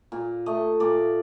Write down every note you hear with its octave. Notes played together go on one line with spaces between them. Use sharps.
A#2
A3 D#5
A#2 D5